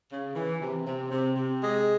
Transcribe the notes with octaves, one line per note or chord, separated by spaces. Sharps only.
C#3
E3
C3
C3
C3
C3
G#3